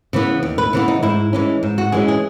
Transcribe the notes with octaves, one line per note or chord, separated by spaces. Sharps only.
C#3 E3 B3
D#2
B4
C#3 E3 B3
D#4
G#2 E4
E3 G#3 C#4
G#2
F#4
E3 G#3 C#4 G#4
G#4